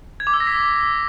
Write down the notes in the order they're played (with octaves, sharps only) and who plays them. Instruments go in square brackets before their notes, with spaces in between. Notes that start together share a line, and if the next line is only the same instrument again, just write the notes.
[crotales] G#6
D6
E6
A#6
B6